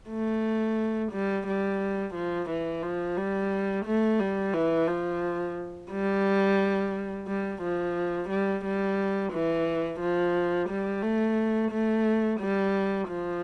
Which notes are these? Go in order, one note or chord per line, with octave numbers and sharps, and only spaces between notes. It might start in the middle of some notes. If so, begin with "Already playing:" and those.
A3
G3
G3
F3
E3
F3
G3
A3
G3
E3
F3
G3
G3
F3
G3
G3
E3
F3
G3
A3
A3
G3
F3